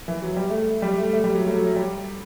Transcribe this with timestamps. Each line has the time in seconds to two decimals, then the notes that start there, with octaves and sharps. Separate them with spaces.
0.08 E3
0.22 F#3
0.36 G3
0.50 A3
0.82 G3
0.98 A3
1.13 A3
1.24 G3
1.35 F#3
1.45 A3
1.55 F#3
1.66 F#3
1.76 G3